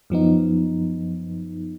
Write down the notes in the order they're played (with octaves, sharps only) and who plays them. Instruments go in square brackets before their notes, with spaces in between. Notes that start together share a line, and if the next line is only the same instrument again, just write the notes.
[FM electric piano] F#2 F3 B3 D#4